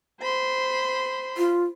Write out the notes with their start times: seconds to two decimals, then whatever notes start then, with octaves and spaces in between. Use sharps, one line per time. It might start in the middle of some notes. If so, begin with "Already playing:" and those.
0.19 C5 B5 C6
1.38 F4